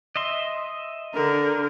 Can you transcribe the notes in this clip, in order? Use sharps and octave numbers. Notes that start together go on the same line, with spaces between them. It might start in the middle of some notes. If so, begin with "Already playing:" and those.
D#5 E5 C6
D3 A#4